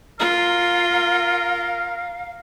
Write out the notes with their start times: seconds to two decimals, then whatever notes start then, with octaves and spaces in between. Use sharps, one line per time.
0.20 F4 A#4 F5